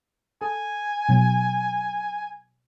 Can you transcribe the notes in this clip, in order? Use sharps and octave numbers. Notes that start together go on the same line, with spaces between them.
A4 G#5
B2 F#3 G#6